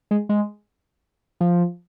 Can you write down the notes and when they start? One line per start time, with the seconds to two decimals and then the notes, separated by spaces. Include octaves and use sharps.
0.11 G#3
0.29 G#3
1.41 F3